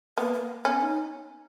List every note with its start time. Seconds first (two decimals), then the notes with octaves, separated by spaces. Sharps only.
0.18 A#3 B3
0.34 A#3
0.65 B3 C#4
0.81 D#4